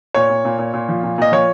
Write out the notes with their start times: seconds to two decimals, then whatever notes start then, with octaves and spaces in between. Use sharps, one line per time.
0.14 A#2 C#5
0.30 A#2
0.45 A#2
0.58 A#2
0.73 A#2
0.89 F3
1.03 A#2
1.18 A#2 D#5
1.32 F3 C#5